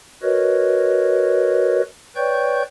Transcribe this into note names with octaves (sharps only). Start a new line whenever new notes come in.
F#4 A#4 B4 C#5 D#5
B4 C#5 D5 G5 C#6 G6